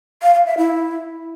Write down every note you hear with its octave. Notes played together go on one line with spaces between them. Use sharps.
F5
F5
E5
E4